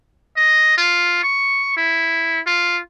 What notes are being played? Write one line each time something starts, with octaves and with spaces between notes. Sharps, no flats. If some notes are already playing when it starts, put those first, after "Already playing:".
D#5
F4
C#6
E4
F4